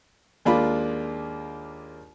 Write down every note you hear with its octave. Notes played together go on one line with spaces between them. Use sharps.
D#2 G#3 A#3 D4 F4 B5